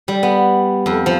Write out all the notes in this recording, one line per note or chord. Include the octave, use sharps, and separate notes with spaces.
G3
B3
F2
F3